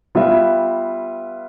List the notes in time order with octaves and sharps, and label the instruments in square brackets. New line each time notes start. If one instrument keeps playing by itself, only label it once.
[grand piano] G3 B3 F4 B4 E5